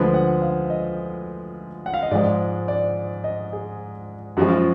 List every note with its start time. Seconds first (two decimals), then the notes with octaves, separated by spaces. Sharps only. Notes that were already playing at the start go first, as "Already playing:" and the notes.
Already playing: D2 D3 F3 G#3 B4
0.14 F#5
0.42 F5
0.70 D#5
1.86 F#5
1.94 F5
2.02 D#5
2.11 G#2 F3 G#3 D5
2.68 D5
3.24 D#5
3.53 G#4
4.37 F#2 F3 G#3 F#4
4.49 F4